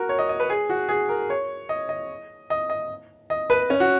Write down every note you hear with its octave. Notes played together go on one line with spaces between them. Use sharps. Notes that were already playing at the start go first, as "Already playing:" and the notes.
Already playing: F#4 A#4
C#5
D#5
D#5
B4
G#4
F#4
G#4
A#4
C#5
D#5
D#5
D#5
D#5
D#5
B4
C#4
F#4